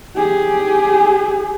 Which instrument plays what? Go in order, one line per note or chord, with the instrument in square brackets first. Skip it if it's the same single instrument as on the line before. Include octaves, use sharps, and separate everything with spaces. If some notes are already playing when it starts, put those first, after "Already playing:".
[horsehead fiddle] G4 G#4